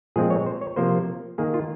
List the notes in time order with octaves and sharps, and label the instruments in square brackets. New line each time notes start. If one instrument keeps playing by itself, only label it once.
[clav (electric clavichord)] A#2 F3 G#3 C4 G#4
C#5
C5
C#5
C3 F3 A#3 C5
D#3 A#3 G#4
F4